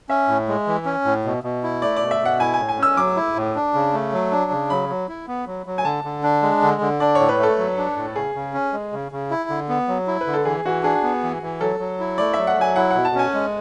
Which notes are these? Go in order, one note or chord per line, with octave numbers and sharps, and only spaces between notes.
C#4 E5
A2
G#3
E3
C#4
A2
B2
B2
E4
A3 D5
B2 D5
E5
B2 F#5
E4 G#5
G#5
A2
G#5
C#4 E6
F#3 D6
E4
A2
D4
C#3
A3
F#3
D4
C#3
F#3 B5
F#3
E4
B3
F#3
F#3
G#5
D3 A5
D3
D4
G#3
D3
D3
D4 D5
A2 C#5
B4
A3 A4
F#3
D4
A2
C#3 G#4
C#3
C#4
G#3
C#3
C#3
E4
D3
B3
F#3
E4
B4
D3
A4
E3 G#4
E3 F#4
D4 G#4
B3
E3
E3
F#3 A4
F#3
E4
A3 D5
F#3 E5
F#5
F#3 G#5
E4 F#5
B2 F#5
A5
C#4 G#5
G#3